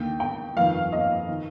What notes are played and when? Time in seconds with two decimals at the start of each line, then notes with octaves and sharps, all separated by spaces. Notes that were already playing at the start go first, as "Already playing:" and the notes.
Already playing: D#2 D3 G5
0.20 G5
0.57 G1 F2 D#3 F5
0.92 D#5
1.29 D#3